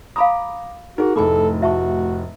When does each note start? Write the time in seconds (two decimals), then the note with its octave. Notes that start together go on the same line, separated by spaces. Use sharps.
0.16 F5 A#5 B5 D6 D#6
0.98 D#4 F#4 G#4 A#4
1.16 F1 A2 A4 G#5 B5 D6
1.62 F#4 E5 A5 C#6